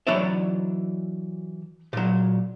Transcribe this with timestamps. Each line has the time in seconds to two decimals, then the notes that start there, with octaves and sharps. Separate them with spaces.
0.07 E3 F#3 D4 C#5 D5 E5
1.93 A#2 F#3